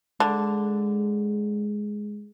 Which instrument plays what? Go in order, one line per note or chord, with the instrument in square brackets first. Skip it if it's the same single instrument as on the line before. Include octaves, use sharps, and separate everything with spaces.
[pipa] D3 [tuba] G#3